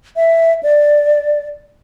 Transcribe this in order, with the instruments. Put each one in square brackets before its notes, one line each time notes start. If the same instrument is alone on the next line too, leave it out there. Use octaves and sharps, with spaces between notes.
[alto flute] E5
D5